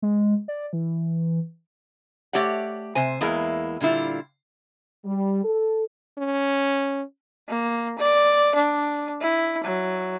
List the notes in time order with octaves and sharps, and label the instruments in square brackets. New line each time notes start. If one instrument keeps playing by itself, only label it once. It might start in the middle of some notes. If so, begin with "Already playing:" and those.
[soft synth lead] G#3
D5
E3
[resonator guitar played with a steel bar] A3 G4 C#5 D5 F#5
C3 C5 G#5
E2 G#3 A#3 E4
A#2 D3 G3 E4 F4
[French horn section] G3
A4
[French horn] C#4
[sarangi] A#3
D5
D4
E4
F#3